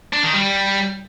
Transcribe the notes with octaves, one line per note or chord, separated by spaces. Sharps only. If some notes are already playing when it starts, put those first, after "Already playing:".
D4
D#3
G3